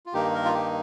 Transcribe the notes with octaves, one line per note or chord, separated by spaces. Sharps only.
F4
G2 D#3 A#3 D#4 G4
A#4
F4
G4